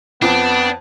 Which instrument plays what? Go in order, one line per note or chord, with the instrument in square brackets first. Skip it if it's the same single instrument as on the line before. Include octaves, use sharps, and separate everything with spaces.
[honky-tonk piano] F2 [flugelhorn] B3 [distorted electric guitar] D4